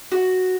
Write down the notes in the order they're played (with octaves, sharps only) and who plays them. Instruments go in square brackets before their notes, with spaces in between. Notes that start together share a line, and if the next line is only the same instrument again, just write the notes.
[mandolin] F#4